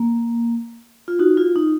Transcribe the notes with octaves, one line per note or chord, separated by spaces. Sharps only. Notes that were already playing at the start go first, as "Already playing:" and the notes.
Already playing: A#3
F4
D#4 F#4
F4
D#4